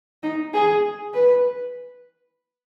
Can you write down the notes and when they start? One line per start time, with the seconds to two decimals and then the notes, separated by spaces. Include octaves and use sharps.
0.23 D#4
0.53 G#4
1.14 B4